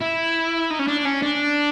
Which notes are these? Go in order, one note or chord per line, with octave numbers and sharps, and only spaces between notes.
E4
D#4
C#4
D4
C#4
D4